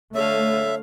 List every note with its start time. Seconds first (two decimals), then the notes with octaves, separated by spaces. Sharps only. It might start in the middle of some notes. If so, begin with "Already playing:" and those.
0.15 D3 A3 C#5 E5 F5